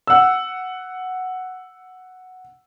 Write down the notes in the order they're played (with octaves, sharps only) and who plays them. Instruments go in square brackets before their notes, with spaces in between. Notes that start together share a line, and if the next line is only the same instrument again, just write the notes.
[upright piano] F#5 E6